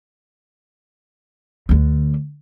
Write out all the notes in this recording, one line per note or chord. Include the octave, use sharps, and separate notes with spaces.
D2 D3